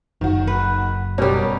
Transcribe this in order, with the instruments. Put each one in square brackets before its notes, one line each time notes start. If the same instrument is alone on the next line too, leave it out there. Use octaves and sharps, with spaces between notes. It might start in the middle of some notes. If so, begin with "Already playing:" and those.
[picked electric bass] F#1 [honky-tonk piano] D#3 F#4
[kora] B4
[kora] B2 G3 [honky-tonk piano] C#4 G4 A#4